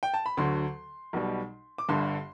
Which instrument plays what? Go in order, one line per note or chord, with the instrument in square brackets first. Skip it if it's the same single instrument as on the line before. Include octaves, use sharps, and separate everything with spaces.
[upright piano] G5
A5
B5
D2 D3 F#3 C6
B1 B2 G3
D6
G1 G2 D3 C6